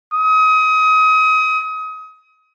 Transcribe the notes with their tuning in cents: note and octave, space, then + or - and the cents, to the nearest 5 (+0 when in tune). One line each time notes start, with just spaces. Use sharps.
D#6 +30